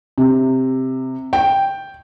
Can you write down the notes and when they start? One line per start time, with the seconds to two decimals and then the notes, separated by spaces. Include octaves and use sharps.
0.18 C3
1.33 G5